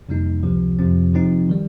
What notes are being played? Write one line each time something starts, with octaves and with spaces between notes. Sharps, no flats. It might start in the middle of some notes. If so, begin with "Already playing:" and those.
F2 C3 G3 A#3 D#4
C#2 C3 F3
F2 C3 F3 C4
C3 F3 C4 D#4
D#3 G3